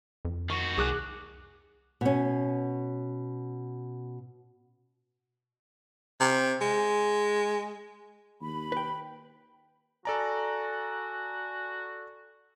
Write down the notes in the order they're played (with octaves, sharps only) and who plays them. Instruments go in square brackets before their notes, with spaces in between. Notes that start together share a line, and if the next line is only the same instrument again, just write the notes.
[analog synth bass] F2
[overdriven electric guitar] D#3 F#4 [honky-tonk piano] C#6
[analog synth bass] C2 [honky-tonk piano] G#4 D6 F#6
[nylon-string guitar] B2 C#4
[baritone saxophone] C3
G#3
[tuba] D#2 [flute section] B5
[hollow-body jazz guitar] B4 G5
[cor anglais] F#4 [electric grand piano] A4 D5 A#5 [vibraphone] G#5